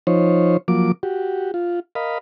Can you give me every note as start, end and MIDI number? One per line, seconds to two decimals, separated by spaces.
0.07 0.57 53
0.07 0.57 63
0.07 0.57 72
0.07 0.57 73
0.68 0.92 53
0.68 0.92 54
0.68 0.92 58
0.68 0.92 86
1.03 1.51 66
1.03 1.51 67
1.54 1.80 65
1.95 2.18 70
1.95 2.18 75
1.95 2.18 77
1.95 2.18 83